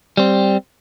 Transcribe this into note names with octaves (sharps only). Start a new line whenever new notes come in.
G3 C4